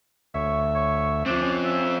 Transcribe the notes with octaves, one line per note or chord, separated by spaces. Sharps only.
D2 C#5 E5
C#5
F3 C4 D4
C#4
E5